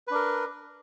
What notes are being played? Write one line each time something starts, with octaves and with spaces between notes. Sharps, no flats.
D4 A#4 B4